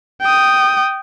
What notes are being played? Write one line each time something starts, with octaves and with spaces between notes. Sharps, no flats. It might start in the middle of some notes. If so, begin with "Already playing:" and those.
G5 D#6